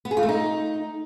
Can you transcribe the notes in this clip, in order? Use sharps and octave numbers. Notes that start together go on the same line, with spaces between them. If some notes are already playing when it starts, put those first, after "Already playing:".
B3
G#4
F4
A3
D#4